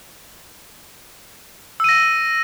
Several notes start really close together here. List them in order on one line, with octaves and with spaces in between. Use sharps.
E6 D#7 A#6